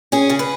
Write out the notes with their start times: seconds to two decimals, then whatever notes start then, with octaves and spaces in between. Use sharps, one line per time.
0.12 C#4 G#4
0.30 C#3
0.39 B4